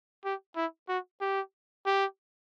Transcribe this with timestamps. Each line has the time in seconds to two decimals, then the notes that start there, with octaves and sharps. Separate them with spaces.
0.25 G4
0.56 E4
0.89 F#4
1.21 G4
1.86 G4